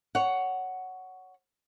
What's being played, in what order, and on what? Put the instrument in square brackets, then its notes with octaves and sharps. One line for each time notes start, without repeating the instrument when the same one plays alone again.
[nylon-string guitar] C#5 F#5